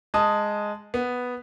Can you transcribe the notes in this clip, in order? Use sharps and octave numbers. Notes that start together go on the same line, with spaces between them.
G#3 A5 D#6
B3